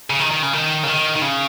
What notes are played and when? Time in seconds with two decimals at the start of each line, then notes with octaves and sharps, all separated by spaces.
0.10 C#3
0.20 D#3
0.31 D#3
0.43 C#3
0.53 D#3
0.83 C#3
0.88 D#3
1.16 D#3
1.21 C#3